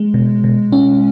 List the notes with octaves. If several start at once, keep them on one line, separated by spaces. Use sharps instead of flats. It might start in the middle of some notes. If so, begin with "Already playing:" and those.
Already playing: G#3
B2
B2
C#4